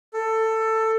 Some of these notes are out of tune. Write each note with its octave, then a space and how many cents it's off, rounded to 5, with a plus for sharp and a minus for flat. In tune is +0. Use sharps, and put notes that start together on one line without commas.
A4 +15